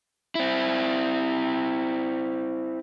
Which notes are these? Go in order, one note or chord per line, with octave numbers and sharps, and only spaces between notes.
C4 E4